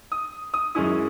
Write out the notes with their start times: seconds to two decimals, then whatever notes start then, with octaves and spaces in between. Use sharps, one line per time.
0.12 D#6
0.54 D#6
0.75 F#2 D#3 G#3 C#4 E4 D#6